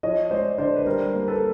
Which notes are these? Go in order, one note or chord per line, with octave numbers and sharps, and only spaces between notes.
F3 C#5 D#5
G#3 C5 D5
D3 C5 D5
B4
G3 A#4 C5
A#3
A4 B4